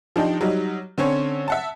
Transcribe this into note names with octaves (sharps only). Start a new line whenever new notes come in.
F3 D4 D#4 G4
F#3 G3 D#4
D3 C4 C#4 C#5
E5 F#5 A5